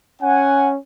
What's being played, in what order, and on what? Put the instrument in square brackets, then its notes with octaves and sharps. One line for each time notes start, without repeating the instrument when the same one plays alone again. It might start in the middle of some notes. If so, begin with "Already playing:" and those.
[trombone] C#4 [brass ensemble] F#5 G#5